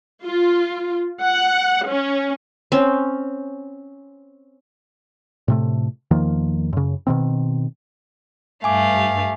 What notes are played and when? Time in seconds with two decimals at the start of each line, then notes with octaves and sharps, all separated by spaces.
0.25 F4
1.21 F#5
1.88 C#4
2.72 C4 C#4
5.48 A2 C3 A3
6.11 E2 D#3 F3 A#3
6.73 F#2 C#3
7.07 B2 D#3 C4
8.64 G2 A3 F5 G#5 D6